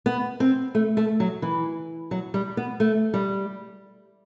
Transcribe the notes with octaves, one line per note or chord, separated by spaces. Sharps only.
B3
C4
A3
A3
F#3
E3
F#3
G3
B3
A3
G3